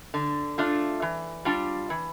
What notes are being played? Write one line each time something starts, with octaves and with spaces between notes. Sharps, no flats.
D3
A3 D4 F4
E3
G3 D4 F4
E3